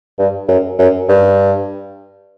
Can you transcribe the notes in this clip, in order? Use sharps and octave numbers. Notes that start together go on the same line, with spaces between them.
G2
F#2
F#2
G2